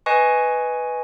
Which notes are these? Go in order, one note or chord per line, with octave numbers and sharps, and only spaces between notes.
B4 D#5 G#5 C#6